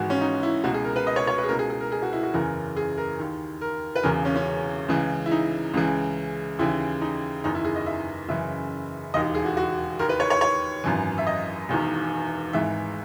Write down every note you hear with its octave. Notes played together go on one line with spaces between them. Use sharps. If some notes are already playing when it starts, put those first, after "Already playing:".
Already playing: G#1 G#2 E3 F#4
C#4
D#4
E4
C#2 B2 F#4
G#4
A#4
B4
D#5
C#5
C#5
B4
G#4
C#2 B2 A#4
G#4
G#4
A#4
G#4
F#4
E4
F#4
F#1 E2 C#3 E3 A#4
G#4
A#4
D#2 D#3
A#4
B4
E1 E2 C#3 E3 A#4
C#4
C#4
C#2 C#3 E3
E4
D#4
C#2 C#3 E3
D#2 C#3 E3 E4
D#4
F#1 E2 D#3 D#4
E4
G#4
D#5
E5
F#1 F#2 C#3 E3 E5
E1 D#2 D#3 D#5
G#4
F#4
F#4
D#2 D#3 A#4
B4
C#5
C#5
C#5
G#1 F#2 E3
E5
D#5
E1 E2 D#3
G#1 G#2 E3 E5